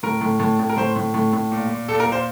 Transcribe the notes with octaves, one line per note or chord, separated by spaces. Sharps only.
A2 A#4
A2
A2
A2
A#4
A2 C5
A2
A2
A2
A#2
A#2
A#2 A4
A#4
A#2
C5